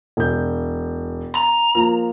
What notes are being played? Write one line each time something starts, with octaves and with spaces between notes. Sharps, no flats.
E1 G6
A#5
F3 A#3